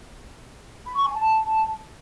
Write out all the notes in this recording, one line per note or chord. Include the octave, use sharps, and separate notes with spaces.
B5
C#6
G#5
A5